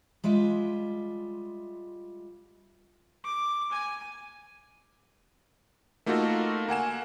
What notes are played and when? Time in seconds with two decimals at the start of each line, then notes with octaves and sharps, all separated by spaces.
0.24 G3 G#3 F4 E5
3.24 D6
3.72 G#5
6.06 A3 A#3 D#4 F4 F#4 A4
6.68 A#3 F#5 G#5 E7